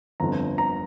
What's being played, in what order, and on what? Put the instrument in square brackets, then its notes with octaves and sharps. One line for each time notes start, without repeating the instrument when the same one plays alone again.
[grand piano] G1 F2 D3 A#5
A#5